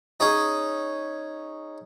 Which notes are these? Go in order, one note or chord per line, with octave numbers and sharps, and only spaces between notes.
C#4 D#4 G#4